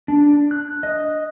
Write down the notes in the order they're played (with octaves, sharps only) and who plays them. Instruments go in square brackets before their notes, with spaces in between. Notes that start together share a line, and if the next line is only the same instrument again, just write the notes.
[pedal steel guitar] D4
F#6
D#5